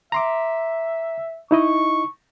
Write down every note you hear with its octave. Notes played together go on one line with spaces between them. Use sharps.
E5 A#5 C6 D6
D#4 E4 D#5 C#6